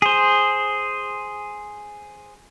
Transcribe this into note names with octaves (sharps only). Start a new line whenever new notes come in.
G#4 C5